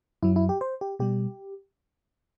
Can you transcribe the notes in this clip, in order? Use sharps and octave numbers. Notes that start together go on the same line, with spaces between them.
F#2 F#3 E4
E4
G4
C5
G4
B2 G3 G4